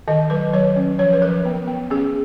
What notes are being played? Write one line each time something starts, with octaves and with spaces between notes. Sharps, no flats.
D#3 D#5
F#3 B4
F#3 C#5
C#4
F3 C#5
B4
F3 A#4
B3
B3
C#4 G#4